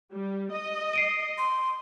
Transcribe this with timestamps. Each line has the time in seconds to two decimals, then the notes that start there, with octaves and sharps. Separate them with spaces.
0.12 G3
0.51 D#5
0.93 C7 D7 D#7
1.38 C6